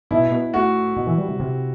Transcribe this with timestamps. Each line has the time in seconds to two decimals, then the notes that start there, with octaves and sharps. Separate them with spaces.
0.11 B2 E4
0.32 B2
0.53 A2 F#4
0.96 B2
1.07 E3
1.18 G3
1.29 C3
1.40 C3